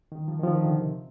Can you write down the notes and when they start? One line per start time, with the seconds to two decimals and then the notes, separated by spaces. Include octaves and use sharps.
0.12 D#3
0.28 F3
0.39 D#3
0.43 F3
0.54 D#3
0.65 D3
0.75 C3